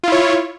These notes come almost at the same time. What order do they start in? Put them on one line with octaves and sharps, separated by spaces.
F4 E4 C#5